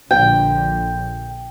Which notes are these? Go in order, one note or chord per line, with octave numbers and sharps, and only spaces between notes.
A#1 D3 G5